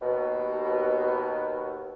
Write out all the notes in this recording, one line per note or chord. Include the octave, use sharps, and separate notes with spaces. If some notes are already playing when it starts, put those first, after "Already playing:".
D#2 B2